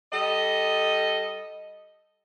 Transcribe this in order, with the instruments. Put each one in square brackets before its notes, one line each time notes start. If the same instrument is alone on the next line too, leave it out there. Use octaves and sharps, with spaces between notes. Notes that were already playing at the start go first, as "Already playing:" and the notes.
[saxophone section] G3 A4 D#5